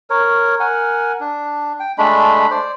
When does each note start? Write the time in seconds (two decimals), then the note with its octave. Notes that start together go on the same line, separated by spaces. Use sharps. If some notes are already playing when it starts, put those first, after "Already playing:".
0.10 A#4 C#5
0.60 A#4 F#5 G#5
1.20 D4
1.80 G5
1.98 G#3 A3 D4 B5
2.51 C5 D5